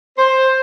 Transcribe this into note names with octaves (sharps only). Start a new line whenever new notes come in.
C5